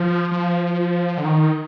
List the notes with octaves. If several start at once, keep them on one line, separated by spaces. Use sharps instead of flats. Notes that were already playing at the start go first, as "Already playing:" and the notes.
Already playing: F3
F3
D3
D#3